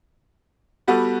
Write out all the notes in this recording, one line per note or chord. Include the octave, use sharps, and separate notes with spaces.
G3 B3 F#4 A4